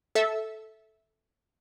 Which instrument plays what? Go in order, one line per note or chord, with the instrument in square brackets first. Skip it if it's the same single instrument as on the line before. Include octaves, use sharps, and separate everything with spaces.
[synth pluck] A4 E5